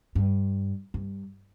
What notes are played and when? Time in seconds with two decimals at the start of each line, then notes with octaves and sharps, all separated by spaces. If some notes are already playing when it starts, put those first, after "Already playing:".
0.15 G2
0.94 G2